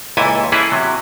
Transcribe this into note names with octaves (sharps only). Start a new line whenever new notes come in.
C#2 A#2 E3 E4 A4 G#5
E3 C#4 E4 G#4 A4 B4
C3 F#3